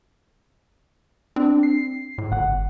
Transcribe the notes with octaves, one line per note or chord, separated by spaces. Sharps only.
C4 D4
C7
A2
G1 F#5